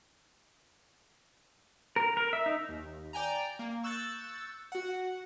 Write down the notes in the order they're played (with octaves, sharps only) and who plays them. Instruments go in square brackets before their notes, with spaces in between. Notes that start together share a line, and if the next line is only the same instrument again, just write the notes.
[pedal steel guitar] A#4
A#4
E5
D#4
[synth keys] D#2
D5 G5 G#5 A#5
A#3
C#6 E6 F#6 G6 A6
F#4 F#5